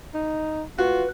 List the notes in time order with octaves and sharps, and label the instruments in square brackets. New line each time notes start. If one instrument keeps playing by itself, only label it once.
[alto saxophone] D#4
[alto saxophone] F4 [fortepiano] F#4 [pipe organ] B4